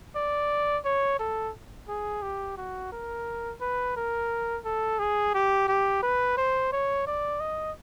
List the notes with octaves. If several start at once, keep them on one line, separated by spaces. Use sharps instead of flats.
D5
C#5
A4
G#4
G4
F#4
A#4
B4
A#4
A4
G#4
G4
G4
B4
C5
C#5
D5
D#5